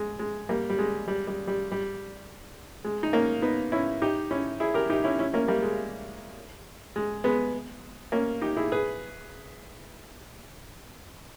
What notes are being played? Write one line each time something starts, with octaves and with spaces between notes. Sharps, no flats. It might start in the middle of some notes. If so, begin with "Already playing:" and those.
Already playing: G#3
G#3
G3 A#3
G3
G#3
G3
G3
G3
G3
G#3
D#4
A#3 C#4
B3 D#4
C#4 E4
D#4 G4
C#4 E4
E4 G#4
G4 A#4
D#4 G4
C#4 E4
C#4 E4
A#3 C#4
G3 A#3
G#3
G#3
G#3 B3
A#3 C#4
D#4 G4
E4 G#4
G#4 B4